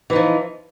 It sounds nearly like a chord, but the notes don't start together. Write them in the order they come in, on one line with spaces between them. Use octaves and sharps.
E3 D#4 F3